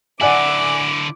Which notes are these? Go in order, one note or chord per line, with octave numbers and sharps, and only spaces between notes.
D3 E4 D5 F#5 G#5 D6